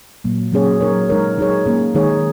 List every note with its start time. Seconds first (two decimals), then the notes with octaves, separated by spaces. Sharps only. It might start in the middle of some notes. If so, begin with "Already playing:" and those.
0.24 A#2 F#3 A#3
0.52 F#3 A#3 C#4 G#4 C#5
0.81 F#3 D#4 A#4 C#5
1.09 G#3 D#4 A#4 C#5
1.38 F#3 D#4 G#4 C#5
1.66 A#3 C#4 G#4
1.95 D#3 G#3 D#4 G#4 C#5